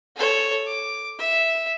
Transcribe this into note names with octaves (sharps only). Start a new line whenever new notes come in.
A4 C#5
D6
E5